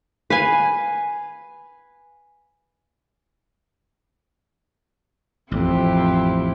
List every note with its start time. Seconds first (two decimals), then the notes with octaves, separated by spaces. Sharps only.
0.30 B4 F5 G#5
5.51 A1 F2 C4 E4 G4